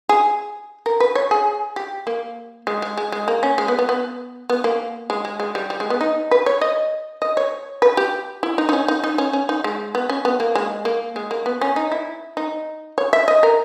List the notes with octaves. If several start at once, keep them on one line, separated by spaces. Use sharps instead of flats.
G#4
A#4
B4
C#5
G#4
G4
A#3
G#3
G#3
G#3
G#3
A#3
C#4
G#3
B3
B3
B3
B3
A#3
G#3
G#3
G#3
G3
G3
G#3
B3
D#4
B4
C#5
D#5
D#5
C#5
B4
G4
E4
D#4
D#4
C#4
D#4
D#4
C#4
C#4
D#4
G#3
B3
C#4
B3
A#3
G#3
A#3
G#3
A#3
B3
C#4
D#4
E4
D#4
C#5
E5
D#5
A#4